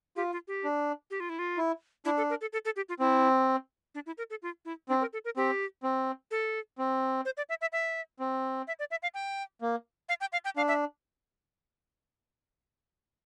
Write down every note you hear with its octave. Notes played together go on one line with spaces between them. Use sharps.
F4 G4
F4
G4
D4
G4
F4
E4
F4
E4
D4 E4
A4
A#4
A4
A4
A4
G4
F4
C4 E4
D4
E4
A#4
A4
F4
E4
C4 D4
A#4
A4
A#4
C4 G4
C4
A4
C4
C5
D5
E5
E5
E5
C4
E5
D5
E5
F5
G5
A#3
F5
G5
F5
G5
D4 F5
E5